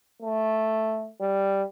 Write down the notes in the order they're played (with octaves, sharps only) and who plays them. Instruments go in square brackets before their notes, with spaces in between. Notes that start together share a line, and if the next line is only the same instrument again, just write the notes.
[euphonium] A3
G3